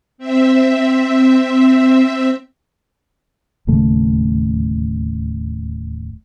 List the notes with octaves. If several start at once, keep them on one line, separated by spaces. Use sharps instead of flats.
C4 E5
D1 D#2 C#3 A3